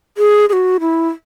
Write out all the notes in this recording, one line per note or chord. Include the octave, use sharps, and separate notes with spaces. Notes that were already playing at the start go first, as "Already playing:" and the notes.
G#4
G#4
F#4
E4